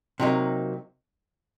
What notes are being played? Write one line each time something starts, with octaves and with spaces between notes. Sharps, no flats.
C3 F#3 A#3 D#4